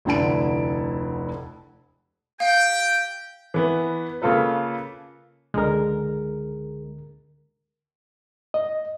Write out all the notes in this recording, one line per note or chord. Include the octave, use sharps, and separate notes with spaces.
F1 D2 D3 E4 A5 D7
G4 F5 G5
E3 B3
C#3 A#3 F4 A4 B4
C#2 D3 G#3 A#4
D#5